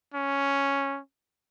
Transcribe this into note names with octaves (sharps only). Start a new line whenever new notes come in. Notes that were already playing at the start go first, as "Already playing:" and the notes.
C#4